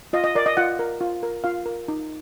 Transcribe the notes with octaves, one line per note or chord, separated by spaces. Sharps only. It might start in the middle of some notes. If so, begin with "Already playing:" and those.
F4 D#5
D#5
A#4 D5
D#5
F4 F#5
A#4
F4
A#4
F4 F5
A#4
D#4